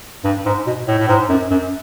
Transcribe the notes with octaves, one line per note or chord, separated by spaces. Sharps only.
G2
G#2
B2
A2
A2
G#2
F#2
F#2